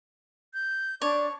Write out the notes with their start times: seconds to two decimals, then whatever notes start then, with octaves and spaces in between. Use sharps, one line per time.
0.55 G6
1.02 D4 C#5 D5 D6